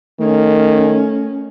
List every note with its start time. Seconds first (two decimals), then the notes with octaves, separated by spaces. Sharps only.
0.20 D#3 A3 C#4